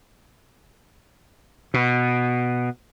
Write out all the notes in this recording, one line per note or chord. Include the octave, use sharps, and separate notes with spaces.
B2